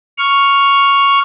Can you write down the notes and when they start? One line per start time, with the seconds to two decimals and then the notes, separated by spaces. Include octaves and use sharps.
0.18 C#6 F6